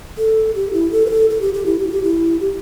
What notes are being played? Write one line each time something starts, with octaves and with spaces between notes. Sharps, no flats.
A4
G4
E4
A4
B4
A4
A4
G4
G4
E4
G4
E4
G4
E4
G4